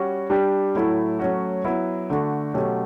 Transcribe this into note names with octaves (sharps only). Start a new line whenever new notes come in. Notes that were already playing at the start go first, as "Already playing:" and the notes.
Already playing: G3 C#4 F#4
G3 D4 G4
A2 F#3 A3 E4
F#3 A3 C#4 F#4
F#3 B3 E4
D3 A3 D4 F#4
B2 F#3 A3 C#4 G4